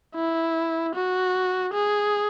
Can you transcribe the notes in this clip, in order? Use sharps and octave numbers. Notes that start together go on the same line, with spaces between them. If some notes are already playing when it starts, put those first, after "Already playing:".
E4
F#4
G#4